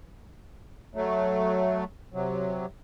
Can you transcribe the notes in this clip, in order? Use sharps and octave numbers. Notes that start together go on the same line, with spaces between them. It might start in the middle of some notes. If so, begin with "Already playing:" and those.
F#3 A3
C3 F#3